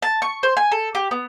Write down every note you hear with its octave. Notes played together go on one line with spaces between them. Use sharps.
A5
C#6
C5
G#5
A4
G4
B3